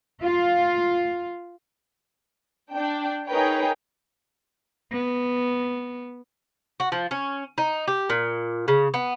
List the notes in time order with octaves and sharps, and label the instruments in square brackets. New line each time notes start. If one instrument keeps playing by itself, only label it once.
[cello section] F4
[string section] D4 G5
D#4 G#4 A#4 B4 C#5 G5
[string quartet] B3
[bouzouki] F#4
F3
C#4
D#4
G4
A#2
C#3
B3